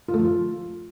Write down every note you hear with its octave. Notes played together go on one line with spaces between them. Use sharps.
F4
A3
F3
F4